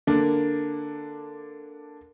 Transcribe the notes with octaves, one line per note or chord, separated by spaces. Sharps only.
D3 A#3 D4